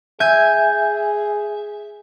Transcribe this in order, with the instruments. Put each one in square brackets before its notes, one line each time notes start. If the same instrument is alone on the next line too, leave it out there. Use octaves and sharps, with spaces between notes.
[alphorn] G#4 [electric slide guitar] E5 [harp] G#5 G6 G#6